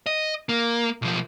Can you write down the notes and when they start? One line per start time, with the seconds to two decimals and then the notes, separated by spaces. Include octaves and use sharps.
0.06 D#5
0.49 A#3
1.02 B1 F3